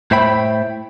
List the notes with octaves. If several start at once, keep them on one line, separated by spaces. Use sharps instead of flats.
A2 C5 E5 G5 B5